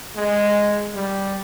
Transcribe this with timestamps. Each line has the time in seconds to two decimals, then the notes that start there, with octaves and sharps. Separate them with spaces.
0.16 G#3
0.94 G3